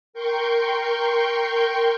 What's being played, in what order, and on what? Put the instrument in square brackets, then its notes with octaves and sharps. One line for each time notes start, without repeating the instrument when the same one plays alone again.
[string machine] A#4 G5 C6 C#6 G6